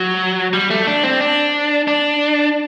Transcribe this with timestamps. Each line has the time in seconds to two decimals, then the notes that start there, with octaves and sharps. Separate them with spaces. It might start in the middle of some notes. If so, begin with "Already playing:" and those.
Already playing: F#3
0.53 G3
0.70 A3
0.87 D4
1.03 C4
1.20 D4
1.88 D4